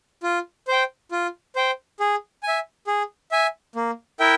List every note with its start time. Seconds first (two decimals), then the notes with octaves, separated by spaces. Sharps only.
0.23 F4
0.68 C5 G5
1.12 F4
1.56 C5 G5
2.00 G#4
2.43 E5 G#5
2.87 G#4
3.31 E5 G#5
3.75 A#3
4.20 E4 A#4 E5 G5